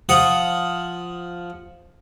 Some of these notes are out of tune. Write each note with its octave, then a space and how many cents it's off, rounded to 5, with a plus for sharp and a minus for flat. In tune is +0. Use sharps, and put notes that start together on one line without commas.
F3 +0 F#5 +0 D#6 +0